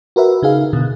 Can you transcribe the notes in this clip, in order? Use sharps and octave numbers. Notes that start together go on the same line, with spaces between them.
F#4 A#4 B4 E5
C#3 D#4 G#4 F5
B2 D3